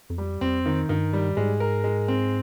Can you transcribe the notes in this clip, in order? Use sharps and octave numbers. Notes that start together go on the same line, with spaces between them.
F2
G3
F2 C4
D#3
G2 D#3
G3
G#2 G#3
A#4
G#3
C4